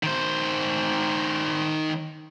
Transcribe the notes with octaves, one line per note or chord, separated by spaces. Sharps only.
D#3 C5